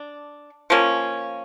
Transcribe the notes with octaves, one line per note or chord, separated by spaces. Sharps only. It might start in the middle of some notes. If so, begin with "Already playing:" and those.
Already playing: D4
F3 A#3 C#4